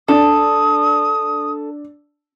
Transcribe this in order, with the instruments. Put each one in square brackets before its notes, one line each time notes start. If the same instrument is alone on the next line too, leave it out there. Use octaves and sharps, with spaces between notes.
[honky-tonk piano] D4 [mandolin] A4 [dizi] D#6